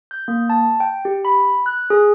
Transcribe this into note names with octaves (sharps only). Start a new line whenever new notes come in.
G6
A#3
A5
G5
G4
B5
F#6
G#4